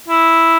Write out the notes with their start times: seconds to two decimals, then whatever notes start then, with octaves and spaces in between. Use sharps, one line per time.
0.08 E4